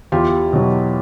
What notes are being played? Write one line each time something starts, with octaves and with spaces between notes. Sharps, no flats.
E2 F4 G4
B2 F#3